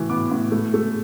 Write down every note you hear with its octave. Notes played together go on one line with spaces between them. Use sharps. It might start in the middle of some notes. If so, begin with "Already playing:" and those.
Already playing: A2 E3
B3 D6
A2
A3
A3